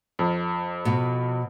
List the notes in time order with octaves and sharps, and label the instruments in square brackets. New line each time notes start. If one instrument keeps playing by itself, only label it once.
[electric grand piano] F2
[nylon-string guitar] B2